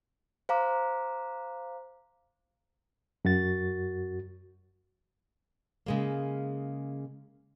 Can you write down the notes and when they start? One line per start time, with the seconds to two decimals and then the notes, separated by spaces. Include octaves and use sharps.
0.49 C5 F5 A#5 D6
3.25 F#2 F#4 A6
5.86 C#3 G#3 A#3